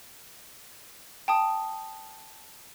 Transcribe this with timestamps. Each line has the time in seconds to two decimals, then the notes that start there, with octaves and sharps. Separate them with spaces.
1.28 G5 A5 D#6